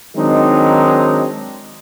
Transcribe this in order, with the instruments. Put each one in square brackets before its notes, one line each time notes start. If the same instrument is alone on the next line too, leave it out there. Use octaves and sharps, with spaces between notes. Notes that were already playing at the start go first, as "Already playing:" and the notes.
[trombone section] D#3 F#3 G#3 C4 D4 D#4